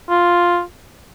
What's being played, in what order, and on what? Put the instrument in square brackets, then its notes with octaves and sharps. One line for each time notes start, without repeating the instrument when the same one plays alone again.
[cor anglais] F4